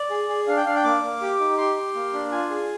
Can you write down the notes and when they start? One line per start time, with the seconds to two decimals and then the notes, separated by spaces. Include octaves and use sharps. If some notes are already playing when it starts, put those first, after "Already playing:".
Already playing: D5
0.10 G#4
0.29 G#4
0.47 D4 F5
0.57 G5
0.66 D4 F5
0.75 G5
0.84 A#3 D6
1.03 A#3
1.22 G4
1.40 D#4
1.58 G4 C6
1.77 G4
1.95 A#3
2.13 D4
2.31 F4 G#5
2.50 G#4